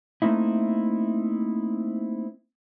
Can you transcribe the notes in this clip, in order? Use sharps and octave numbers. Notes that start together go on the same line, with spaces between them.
A3 A#3 C4 D#4 E4